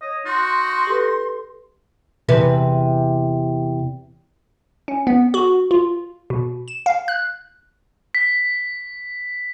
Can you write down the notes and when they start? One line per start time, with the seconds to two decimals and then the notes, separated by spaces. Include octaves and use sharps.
0.02 C#5 D#5
0.26 D#4 F#4 C6
0.87 G4 A4 B4
2.29 E2 C3 B4
4.88 C#4
5.07 B3
5.34 F#4
5.71 F4
6.30 B2
6.68 E7
6.86 F5
7.08 F#6
8.15 B6